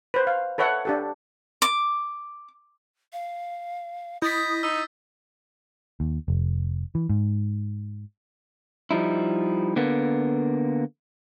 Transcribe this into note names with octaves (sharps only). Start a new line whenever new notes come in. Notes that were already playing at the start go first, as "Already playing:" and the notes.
B4 C5
F5
A4 B4 C#5 E5 F#5
D4 G4 A4
D6
F5
E4 D#5 D#6 G6 A6 B6
D#4 E6
D#2
F1
E3
G#2
F3 G3 D#4 E4
D3 A#3 B3